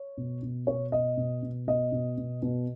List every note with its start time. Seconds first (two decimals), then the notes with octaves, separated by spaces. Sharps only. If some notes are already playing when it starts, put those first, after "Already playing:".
Already playing: C#5
0.17 B2
0.43 B2
0.67 B2 C#5
0.92 B2 D#5
1.17 B2
1.43 B2
1.67 B2 D#5
1.92 B2
2.18 B2
2.42 B2